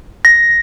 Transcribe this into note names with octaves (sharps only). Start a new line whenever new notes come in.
A#6